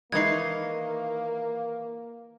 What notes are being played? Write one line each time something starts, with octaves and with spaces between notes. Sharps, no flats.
D#3 E3 G#3 A#3 D#4 G#6 C7